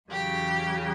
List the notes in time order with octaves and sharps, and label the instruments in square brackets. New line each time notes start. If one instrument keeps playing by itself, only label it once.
[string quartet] E2 C#3 F#3 G4